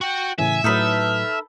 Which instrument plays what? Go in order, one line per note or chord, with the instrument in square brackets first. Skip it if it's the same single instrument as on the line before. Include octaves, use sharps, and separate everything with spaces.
[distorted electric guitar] F#4 F#5 [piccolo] G5
[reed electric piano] A2 C#3 E3 [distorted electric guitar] E5 [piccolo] G#5
[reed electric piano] A2 F#3 [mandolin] D#4 A4 B4 [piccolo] F6